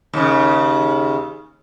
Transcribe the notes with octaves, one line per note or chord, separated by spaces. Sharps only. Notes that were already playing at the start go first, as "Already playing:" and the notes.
D#2 C#3